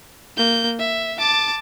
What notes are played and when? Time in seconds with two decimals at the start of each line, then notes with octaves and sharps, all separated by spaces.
0.37 A#3 G6
0.79 E5
1.18 A5 D6